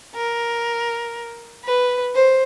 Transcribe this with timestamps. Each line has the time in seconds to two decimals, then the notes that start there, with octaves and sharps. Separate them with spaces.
0.16 A#4
1.65 B4
2.15 C5